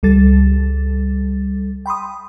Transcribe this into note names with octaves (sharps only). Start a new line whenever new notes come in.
C#2 G3 A4 A6
G5 B5 C6 D#6